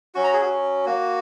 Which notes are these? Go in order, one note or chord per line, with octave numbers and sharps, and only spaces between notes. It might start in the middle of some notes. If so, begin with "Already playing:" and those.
F#3 C#4 F#4 C#6
A#5
G#4
F#4
A#3 F#4